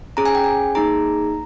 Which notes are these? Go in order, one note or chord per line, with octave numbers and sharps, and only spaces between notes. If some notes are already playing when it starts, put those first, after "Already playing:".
C#4 G#4 A#5
G#5
G5
G#5
A#3 D#4 G#4 A#5